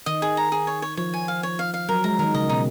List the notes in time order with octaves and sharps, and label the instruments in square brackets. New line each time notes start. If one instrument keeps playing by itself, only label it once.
[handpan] D#3 [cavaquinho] D#5
[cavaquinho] G#4
A#5
G#4
C#5
C#5
[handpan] F3 [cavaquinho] C#5
[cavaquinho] G#5
F5
C#5
F5
F5
[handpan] F#3 [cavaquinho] A#4
[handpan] G#3 [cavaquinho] A#5
[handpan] D#3 [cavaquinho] A#4
[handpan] C#3 [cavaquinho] D#5
[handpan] B2 [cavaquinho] D#4